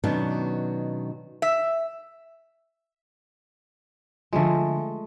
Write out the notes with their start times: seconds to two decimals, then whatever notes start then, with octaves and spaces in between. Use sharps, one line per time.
0.04 B2 D#3 F#3 B3 C#4 D4
1.42 E5
4.33 D3 F3 G#3 A3 F4